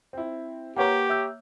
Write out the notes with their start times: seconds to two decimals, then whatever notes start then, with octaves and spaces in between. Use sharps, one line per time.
0.13 C4 E4
0.76 A#3 G4 B4 C#5 F#5 G5 A#5
1.10 E5 E6 G6